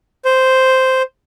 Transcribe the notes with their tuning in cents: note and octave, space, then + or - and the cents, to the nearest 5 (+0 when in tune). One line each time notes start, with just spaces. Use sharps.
C5 -5